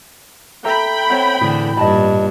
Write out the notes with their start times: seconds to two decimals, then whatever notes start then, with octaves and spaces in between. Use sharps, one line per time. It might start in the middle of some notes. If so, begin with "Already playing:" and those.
0.65 A4 E5 G5 A#5 B5
1.10 C4 C#5 F#5
1.41 A2 D3 E3 G#4
1.77 G2 A#2 D#5 A5 B5